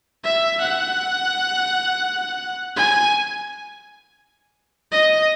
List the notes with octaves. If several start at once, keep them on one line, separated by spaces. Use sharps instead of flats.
E5
F#5
G#5
D#5